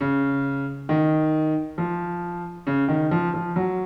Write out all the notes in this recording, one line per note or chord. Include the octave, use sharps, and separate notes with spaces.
C#3
D#3
F3
C#3
D#3
F3
F3
F#3